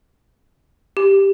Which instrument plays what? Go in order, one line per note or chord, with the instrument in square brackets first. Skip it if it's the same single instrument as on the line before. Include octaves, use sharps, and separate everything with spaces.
[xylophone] G4